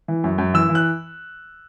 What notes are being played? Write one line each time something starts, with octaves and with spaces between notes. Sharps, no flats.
E3
F#2
F#2
E3 E6
E3
F#6